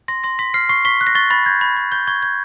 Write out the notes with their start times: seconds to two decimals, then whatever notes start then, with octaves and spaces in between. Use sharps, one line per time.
0.08 C6 A#6
0.24 C6 A#6
0.39 C6 B6
0.54 F6 C7
0.69 C#6 C7
0.85 C#6 B6
1.01 F#6
1.07 A#6
1.15 C#6 A6
1.30 B5 A6
1.46 G6 G#6
1.61 B5
1.77 B5
1.92 C#6 G6
2.07 C#6 G#6
2.22 G6 G#6